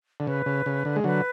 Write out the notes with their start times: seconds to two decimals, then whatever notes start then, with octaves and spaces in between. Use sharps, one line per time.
0.20 D3
0.26 C#3 B4
0.46 C#3
0.66 C#3
0.85 D3
0.96 G#3
1.04 D3 F#3 B4